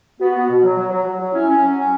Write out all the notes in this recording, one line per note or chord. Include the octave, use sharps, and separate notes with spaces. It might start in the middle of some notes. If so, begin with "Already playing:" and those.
B3 F#4
B3
B2
F#3
F#3
F#3
F#3
F#3
C#4 E4
C#4
F#3
C#4